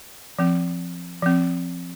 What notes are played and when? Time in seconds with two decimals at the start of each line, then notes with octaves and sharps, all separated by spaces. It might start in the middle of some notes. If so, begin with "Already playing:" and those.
0.39 F3 C4
1.22 F3 C4